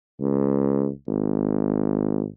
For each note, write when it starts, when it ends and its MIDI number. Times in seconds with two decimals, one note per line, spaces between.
0.21 0.89 37
1.07 2.25 32